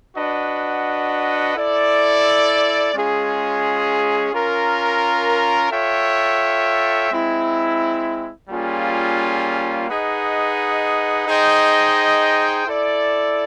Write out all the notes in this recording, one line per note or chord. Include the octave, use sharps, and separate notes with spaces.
D4 F#4 B4 D#5 F#5
E4 A4 D5
G#3 C#4 F4 G#4
C#4 F4 A#4
F4 A4 C#5 E5 G5
G#3 C4 E4
G3 A#3 C#4 F4 G#4
D#4 G#4 B4 D#5 F#5
D#4 G#4 C5 D#5 G5
E4 A4 D5